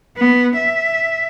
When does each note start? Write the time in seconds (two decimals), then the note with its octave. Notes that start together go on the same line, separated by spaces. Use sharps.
0.17 B3
0.56 E5